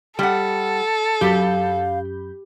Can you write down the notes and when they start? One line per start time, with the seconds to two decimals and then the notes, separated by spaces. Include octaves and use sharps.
0.19 G3 A4 F#5
1.21 F#2 G4 F5 B5 G6